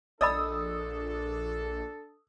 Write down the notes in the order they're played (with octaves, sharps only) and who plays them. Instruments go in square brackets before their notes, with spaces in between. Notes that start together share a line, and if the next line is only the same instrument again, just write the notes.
[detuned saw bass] A#1 [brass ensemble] D4 A4 [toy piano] D5 D#5 B5 [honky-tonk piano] D#6 E6